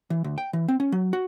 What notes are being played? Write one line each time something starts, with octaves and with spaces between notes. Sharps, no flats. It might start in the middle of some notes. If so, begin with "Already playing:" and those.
E3
D2
G5
E3
C4
C#4
F#3
F#4